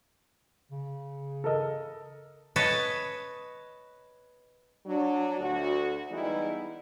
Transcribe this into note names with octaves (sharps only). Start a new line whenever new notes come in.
C#3
A4 A#4 D#5
B4 C#5 D#5 A5
F#3 D4
D2 F#4
E3 G3 G#3 B3 D#4 E4